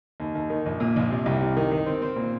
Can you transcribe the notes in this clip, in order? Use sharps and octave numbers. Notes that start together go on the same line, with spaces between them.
D#2
D#2
D#3
A#1
A#2
A#1
C3
C2
C3
D#3
D#3
C4
C4
A#2